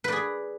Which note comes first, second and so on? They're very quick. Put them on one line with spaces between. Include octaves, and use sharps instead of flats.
B4 D5 G#4